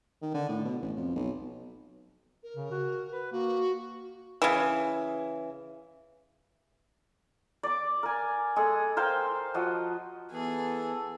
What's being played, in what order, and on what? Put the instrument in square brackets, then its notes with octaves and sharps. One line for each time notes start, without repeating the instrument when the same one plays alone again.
[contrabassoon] D#3
D3
A2
B2
A1
F2
B1
[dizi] A#4
[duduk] C#3
F#4
B4
[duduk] A#3 [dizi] F#4
[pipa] C#3 E3
[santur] D5 D6
A#4 G#5
G#3 G#4 A4
A#4 C5 F5 G5
F3 F#4 D#5
[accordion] E3 [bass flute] B3 [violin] G#4 [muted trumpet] A4